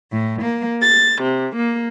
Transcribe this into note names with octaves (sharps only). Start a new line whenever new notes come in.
A2
A#3
A6
C3
A#3